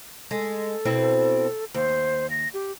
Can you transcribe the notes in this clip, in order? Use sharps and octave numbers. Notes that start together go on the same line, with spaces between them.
G#3 A4
B2 C4 E4
D#2 C5
A#6
G4